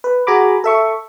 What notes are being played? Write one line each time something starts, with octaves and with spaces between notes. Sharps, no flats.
B4
F#4 G#4 G#5 A#5 B5 D6
A4 E5 C#6